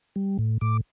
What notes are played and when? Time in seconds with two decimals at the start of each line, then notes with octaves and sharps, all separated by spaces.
0.16 G3
0.39 A2
0.61 A2 D6